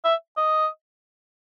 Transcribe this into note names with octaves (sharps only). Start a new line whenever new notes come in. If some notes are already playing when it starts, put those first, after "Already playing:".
E5
D#5